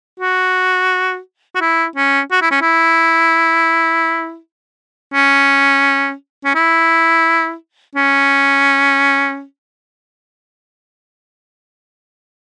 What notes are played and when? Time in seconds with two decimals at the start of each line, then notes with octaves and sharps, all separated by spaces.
0.20 F#4
1.55 F#4
1.61 E4
1.96 C#4
2.31 F#4
2.42 E4
2.51 C#4
2.61 E4
5.14 C#4
6.45 C#4
6.55 E4
7.95 C#4